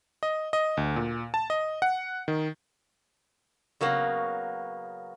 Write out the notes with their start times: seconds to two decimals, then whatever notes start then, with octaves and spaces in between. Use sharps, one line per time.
0.23 D#5
0.53 D#5
0.77 D2
0.96 A#2
1.34 A5
1.50 D#5
1.82 F#5
2.28 D#3
3.81 C#3 F#3 A#3 B3